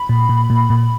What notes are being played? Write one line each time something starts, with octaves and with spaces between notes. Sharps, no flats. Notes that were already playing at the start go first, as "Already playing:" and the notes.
Already playing: B5
A#2
A#2
A#2
A#2